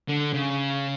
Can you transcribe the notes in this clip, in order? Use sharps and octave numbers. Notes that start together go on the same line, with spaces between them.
D3
C#3